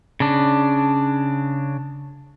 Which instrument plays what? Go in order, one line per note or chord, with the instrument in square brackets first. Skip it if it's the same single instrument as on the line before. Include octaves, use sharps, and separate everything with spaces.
[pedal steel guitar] C#3 D4